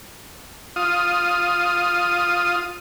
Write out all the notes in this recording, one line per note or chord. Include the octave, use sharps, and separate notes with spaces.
F4 D#6